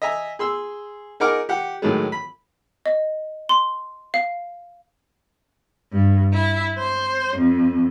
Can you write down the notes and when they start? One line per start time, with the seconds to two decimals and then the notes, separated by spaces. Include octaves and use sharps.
0.02 D#5 E5 G#5 A#5
0.39 G#4 C6 E6
1.20 D#4 G#4 A#4 F#5 D6 F6
1.49 G4 F#5
1.82 A2 D#3 F#3 G#3
2.12 B5
2.86 D#5
3.49 C6
4.14 F5
5.93 G2
6.34 E4
6.78 C5
7.38 F2